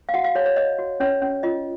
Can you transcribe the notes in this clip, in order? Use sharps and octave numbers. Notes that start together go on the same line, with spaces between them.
F5
F#4 F#5
F5
F#4 C#5
C#5
C#5 D#5
F#4
C#4 C#5
C#4
F4 D#5